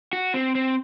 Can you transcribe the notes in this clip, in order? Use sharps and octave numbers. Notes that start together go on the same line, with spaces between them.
F#4
C4
C4